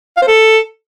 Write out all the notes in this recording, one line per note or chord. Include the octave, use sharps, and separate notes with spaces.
F5
C5
A4